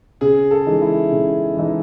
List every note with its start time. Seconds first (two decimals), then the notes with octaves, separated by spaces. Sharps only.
0.21 C#3 G#4
0.51 A4
0.66 E3 G#3 D#4
0.82 E4
1.12 C#3
1.57 E3 G#3 D#4